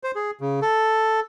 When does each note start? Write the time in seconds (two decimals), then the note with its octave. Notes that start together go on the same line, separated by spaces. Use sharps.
0.04 C5
0.15 G#4
0.41 C#3
0.62 A4